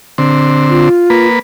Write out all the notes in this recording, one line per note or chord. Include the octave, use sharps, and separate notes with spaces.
D3 C4
F4
A#3 B4